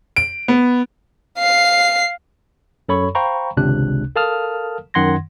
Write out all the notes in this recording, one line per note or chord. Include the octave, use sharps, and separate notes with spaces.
D7
B3
F5 C7
F#2 A4 C#5 B5 C#6
C5 F5 G5 A#5 B5 C#6
G#1 C#2 C3 D4 F#6
A4 A#4 F5 A5 D#6 F6
F#2 D#3 F#5 C6 G#6 A#6